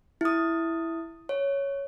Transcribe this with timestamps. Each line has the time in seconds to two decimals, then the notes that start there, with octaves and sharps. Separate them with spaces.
0.21 E4 D#6
1.29 C#5